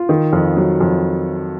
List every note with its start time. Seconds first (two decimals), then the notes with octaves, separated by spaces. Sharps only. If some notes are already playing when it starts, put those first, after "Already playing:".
Already playing: F4
0.09 D#3
0.33 F2
0.57 F#3
0.81 F2